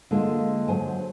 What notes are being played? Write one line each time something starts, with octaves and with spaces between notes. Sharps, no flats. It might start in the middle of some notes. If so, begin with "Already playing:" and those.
D3 G#3 A#3 F4
F#3 C5 G#5 A5